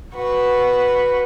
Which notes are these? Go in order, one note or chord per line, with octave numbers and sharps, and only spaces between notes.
F#4 B4